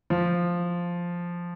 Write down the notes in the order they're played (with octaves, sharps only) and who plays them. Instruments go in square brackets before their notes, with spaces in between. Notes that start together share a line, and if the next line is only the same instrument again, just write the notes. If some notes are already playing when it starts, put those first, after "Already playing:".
[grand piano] F3